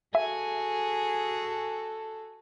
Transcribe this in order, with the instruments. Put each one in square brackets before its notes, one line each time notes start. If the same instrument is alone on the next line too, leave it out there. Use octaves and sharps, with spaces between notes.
[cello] F#4 G#4 [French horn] A4 [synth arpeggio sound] E5 [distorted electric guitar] G#5